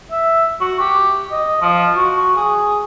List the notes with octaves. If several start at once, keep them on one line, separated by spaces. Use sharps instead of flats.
E5
F#4
G4
D#5
F3
F#4
G#4